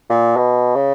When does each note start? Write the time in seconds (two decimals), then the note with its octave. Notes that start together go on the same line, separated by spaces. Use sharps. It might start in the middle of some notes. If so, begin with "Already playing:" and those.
0.10 A#2
0.37 B2
0.75 C#3